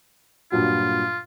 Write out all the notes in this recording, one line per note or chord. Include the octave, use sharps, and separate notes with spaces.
G2 A#2 F#3 F4